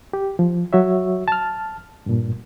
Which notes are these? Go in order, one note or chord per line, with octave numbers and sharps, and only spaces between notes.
G4
F3
F#3 F#4 C#5 E5
A5 F6
G2 A#2